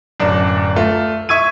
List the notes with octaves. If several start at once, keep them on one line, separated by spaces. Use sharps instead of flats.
D1 F#2 D4
A3 F4
E5 C#6 E6 G#6 D#7